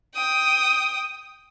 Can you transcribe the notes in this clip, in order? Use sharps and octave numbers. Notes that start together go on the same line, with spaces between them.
G5 D#6